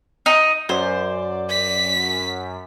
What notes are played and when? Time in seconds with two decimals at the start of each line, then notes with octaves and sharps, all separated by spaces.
0.26 D#4
0.69 F#2 C5 D5
1.49 B6